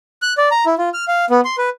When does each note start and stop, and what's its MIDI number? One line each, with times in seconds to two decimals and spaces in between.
0.22 0.33 90
0.38 0.49 74
0.51 0.65 82
0.66 0.75 64
0.78 0.89 65
0.94 1.05 89
1.08 1.25 77
1.30 1.41 59
1.45 1.56 84
1.58 1.69 71